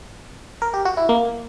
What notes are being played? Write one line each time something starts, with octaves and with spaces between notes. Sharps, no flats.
A#4
G4
F#4
E4
A#3